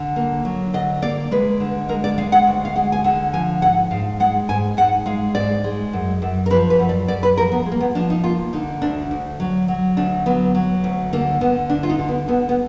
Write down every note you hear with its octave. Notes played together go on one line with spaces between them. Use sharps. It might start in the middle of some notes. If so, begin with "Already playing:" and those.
Already playing: D3
A#3
F#3
D3 D#5
A#3 D5
G#3 B4
D3
G#3 A#4
D5
G#3 F5
F#5
D2
F5
G#3 F#5
G#5
D3 F#5
F3 G#5
G#2 F#5
G#2 F5
G#3 F#5
G#2 G#5
G#2 F#5
G#3 F5
G#2 D5
G#3
F#2
F#2
A#4
F3 B4
B4
F#2
D5
F#2 D5
B4
F3 A#4
B3
G#3
A#3
B3
F3 D4
D#4
A#3 F4
D3 D#4
D2 D4
D2
F#3
F#3
D2 D4
F#3 B3
F#3
D2
D3 A#3
D3 B3
D2 D4
F4
D#4
D3
B3
D3 B3
B3